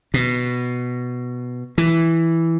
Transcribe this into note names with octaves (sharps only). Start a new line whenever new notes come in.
B2
E3